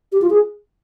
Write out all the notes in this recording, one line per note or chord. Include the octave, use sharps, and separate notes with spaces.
G4
F4
G#4